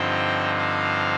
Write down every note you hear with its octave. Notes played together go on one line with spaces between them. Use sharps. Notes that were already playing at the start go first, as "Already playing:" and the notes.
Already playing: G2 D3 F3 C4 D#4 G5
F5